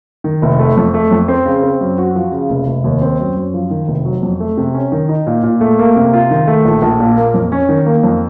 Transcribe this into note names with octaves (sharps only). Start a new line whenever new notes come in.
D#3
F1
A3
F2
A3
F2
C4
C#3
C4
F#2
F#4
F3
C#3
F1
F1
D#2
C4
F#2
F#2
F3
D#3
F1
F#3
F2
A3
C3
C#4
D#3
D#4
A#2
A#2
A3
A#3
C3
F4
D#3
A3
A#1
A#1
A#2
A#3
F2
C#4
D#3
A#3
F2